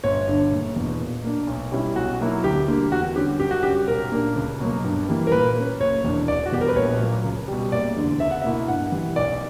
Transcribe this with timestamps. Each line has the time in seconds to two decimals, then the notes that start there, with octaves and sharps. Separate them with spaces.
0.04 G1 C#5
0.28 G2 D3
0.52 F#1
0.76 E2 B2
1.00 A#2
1.24 A#3 D4
1.47 B1
1.71 B2 G3 C#4 E4
1.96 B1 F#4
2.20 B2 F#3 A#3 E4
2.44 D2 G4
2.68 D3 G3 A#3
2.92 E2 F#4
3.15 D3 G3 C#4 G4
3.40 F#2 G4
3.51 F#4
3.63 C#3 G3 G4
3.88 B1 A#4
4.12 A#2 A#3 D4
4.36 C#2
4.60 B2 F#3 A#3
4.84 G2
5.08 E3 G3 A#3
5.27 A#4
5.32 A#2 B4
5.56 A#3 C#4
5.80 F#1 C#5
6.04 E2 B2 A#3 D4
6.28 E1 D5
6.46 F#4
6.52 E2 B2 G3 B3 G4
6.61 A#4
6.68 B4
6.76 A#1 C#5
7.00 A#2 F#3 A#3
7.24 C#2
7.48 B2 G3
7.72 F#1 D5
7.96 E2 D3
8.20 C#2 E5
8.31 F#5
8.42 B2 A#3 E4 E5
8.68 G2 F#5
8.92 E3 G3
9.16 B1 D5